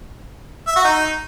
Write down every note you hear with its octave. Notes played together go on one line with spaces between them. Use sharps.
E5
F#4
D#4